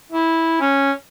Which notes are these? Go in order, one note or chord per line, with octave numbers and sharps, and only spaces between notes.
E4
C#4